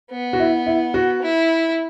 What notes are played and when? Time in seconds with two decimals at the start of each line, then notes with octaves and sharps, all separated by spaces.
0.11 B3
0.33 F#4
0.40 E4
0.66 E4
0.94 F#4
1.22 E4